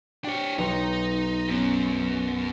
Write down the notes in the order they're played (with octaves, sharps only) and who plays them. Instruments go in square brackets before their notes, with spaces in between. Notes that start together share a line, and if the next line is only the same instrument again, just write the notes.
[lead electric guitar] D4 C#5 [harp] G4 G5
[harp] B1 [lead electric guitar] D#4 [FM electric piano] C#5
[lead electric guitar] F#2 [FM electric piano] F#3 B3 C#4